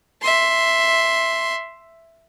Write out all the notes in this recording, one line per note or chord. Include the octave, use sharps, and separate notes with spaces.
E5 C6